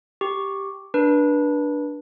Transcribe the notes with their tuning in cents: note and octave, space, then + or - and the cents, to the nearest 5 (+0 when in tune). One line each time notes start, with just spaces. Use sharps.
G4 +0 C#6 +0
D4 +0 B4 -25